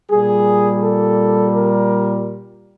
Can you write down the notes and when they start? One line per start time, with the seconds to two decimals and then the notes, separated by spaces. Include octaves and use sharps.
0.10 A#2 G3 G#4
0.82 A4
1.55 A#4